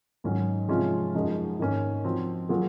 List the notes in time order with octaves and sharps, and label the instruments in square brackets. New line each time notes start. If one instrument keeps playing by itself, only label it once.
[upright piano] G#2 D#3 F#3 C#4
C3 F3 G#3 C#4 F4
F#2 F3 G#3 D#4
G#2 D#3 A#3 C#4
F3 C4 F#4
F#3 A#3 F4 G#4